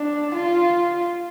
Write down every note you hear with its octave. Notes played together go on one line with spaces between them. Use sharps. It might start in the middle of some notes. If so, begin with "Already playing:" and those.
Already playing: D4
F4